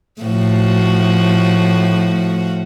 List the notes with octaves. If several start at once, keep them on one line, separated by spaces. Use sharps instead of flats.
A2 F3 F#4